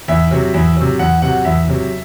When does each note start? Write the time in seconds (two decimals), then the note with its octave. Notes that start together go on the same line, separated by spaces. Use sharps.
0.08 E2 E5
0.31 C3 F#3
0.54 E2
0.77 C3 F#3
0.99 E2 F#5
1.22 C3 F#3 F#5
1.45 E2 E5
1.67 C3 F#3